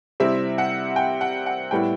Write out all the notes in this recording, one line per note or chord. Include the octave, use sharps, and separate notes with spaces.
C3 G3 C4 E4 E5
F#5
G5
F#5
F#5
A2 G3 B3 E4 G5